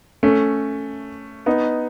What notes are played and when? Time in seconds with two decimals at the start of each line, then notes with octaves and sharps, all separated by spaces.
0.23 A3 C#4
1.46 B3 D#4